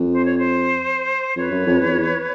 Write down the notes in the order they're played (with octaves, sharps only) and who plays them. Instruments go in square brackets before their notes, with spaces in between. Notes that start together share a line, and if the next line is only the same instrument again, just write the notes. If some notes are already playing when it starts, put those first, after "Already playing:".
Already playing: [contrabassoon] F2
[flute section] C5
C#5
C5
[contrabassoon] F2 [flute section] B4 C#5
[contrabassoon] F#2
F2
E2
F2
E2